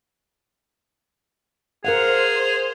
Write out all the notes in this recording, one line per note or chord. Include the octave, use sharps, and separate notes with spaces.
G#4 A#4 C5 F5 F#5 F7